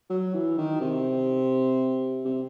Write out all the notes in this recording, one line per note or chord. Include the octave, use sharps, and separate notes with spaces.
F#3
E3
D#3
C3
C3